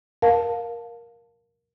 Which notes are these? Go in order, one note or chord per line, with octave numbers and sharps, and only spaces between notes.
A#4 F5 A5